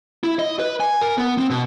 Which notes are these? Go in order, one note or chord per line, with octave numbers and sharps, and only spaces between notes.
E4
D#5
B4
G#5
A#4
B3
C4
B2